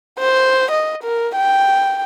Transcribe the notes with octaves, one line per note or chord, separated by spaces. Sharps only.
C5
D#5
A#4
G5